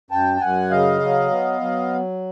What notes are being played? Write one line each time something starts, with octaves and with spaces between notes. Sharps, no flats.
F#2 G5 A5
A5
F#2 F#5 G#5
C#3 D#5 F5
F#3
B3
F#3